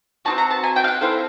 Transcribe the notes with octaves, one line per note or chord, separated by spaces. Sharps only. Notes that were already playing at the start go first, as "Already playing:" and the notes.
D#4 F#4 A5
C4
A#5
A5
G#5
G5
F5
F#5
C4 E4 A4 F5